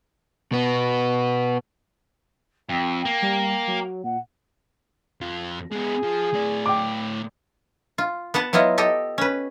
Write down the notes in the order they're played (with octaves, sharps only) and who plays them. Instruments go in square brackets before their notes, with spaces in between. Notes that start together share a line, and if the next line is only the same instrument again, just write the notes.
[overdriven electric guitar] B2 B3
[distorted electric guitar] F2 [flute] G5
[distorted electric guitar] A#3
[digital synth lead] G3
F#3
[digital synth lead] A#2 [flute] F#5
[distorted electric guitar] F2 F4
[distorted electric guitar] G#3 B3 [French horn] G#4
[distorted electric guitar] F3
A2 D5
[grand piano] G5 D6
[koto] F4
B3 B4 F#5 A5
F#3 B3 E4 F4 D#5
G4 A4 D#5
C#4 B4